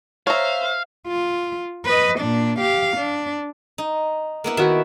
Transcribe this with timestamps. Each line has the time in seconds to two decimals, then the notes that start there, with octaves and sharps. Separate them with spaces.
0.27 C5 C#5 E5 F5 A#5
1.07 F4
1.85 B4 D#5
2.19 A#2 D4
2.60 G4 F5
2.97 D4
3.78 D#4
4.44 A#3 B3 E4
4.57 D#3 E4 F#4 E5